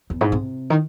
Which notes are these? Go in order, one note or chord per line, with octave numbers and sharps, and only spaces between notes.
E2
G#2
C3
D#3